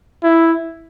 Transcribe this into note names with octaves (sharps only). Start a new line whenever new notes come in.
E4